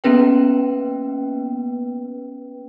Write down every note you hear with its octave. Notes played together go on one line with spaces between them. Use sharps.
A#3 B3 C#4 B4 G5